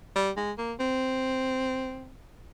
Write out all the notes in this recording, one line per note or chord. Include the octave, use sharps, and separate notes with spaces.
G3
G#3
A#3
C4